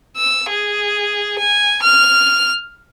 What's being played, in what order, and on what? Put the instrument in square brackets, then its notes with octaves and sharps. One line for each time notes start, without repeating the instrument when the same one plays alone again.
[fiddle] E6
G#4
G#5
F6